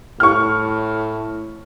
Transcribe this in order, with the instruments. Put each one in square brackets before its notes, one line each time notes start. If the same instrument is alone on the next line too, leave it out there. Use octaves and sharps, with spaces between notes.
[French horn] A2 [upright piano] C#6 F6